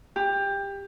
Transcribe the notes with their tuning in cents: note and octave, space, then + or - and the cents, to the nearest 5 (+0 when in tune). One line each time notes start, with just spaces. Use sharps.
G4 +20